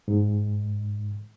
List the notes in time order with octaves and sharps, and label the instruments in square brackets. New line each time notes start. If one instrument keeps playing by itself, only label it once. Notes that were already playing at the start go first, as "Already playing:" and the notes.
[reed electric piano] G#2